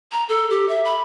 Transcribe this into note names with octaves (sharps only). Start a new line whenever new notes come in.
A#5
A4
G4
E5
B5